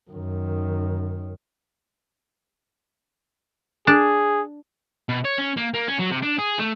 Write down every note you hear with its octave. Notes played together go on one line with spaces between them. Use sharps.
F#2 D#3
D4 G#4
B2
C#5
C#4
A#3
A#3
C#4
F#3
C3
D4
G#4
A3